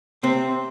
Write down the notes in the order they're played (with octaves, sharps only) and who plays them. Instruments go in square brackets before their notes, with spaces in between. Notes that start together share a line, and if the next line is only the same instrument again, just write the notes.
[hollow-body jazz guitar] C3 C4